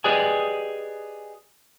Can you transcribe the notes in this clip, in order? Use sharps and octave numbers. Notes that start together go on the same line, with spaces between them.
G4 G#4 B4 D5 D#5 G#5